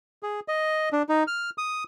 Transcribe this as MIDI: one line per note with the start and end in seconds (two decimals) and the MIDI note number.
0.23 0.40 68
0.48 0.89 75
0.93 1.02 62
1.09 1.23 63
1.27 1.50 89
1.58 1.84 87